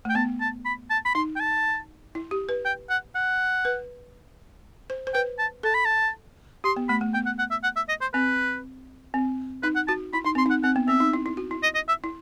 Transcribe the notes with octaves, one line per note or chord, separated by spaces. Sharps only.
A3 G5
B3 A5
A5
B5
A5
B5
D#4 C6
G5
A5
E4
G4
B4
G5
F#5
F#5
B4
C5
C5
B4 G5
A5
A4 A5
B5
A5
G4 C6
B3
A3 B5
A3
B3 G5
F#5
F#5
E5
F#5
E5
D#5
C5
C4 B4
C4
D#4 B4
F#5
F#4 A5
E4 B5
D#4 C6
C4 C6
D#4 F#5
C4 F#5
B3
C4 E5
D#4
E4
E4
F#4
E4
D#5
D#5
E5
E4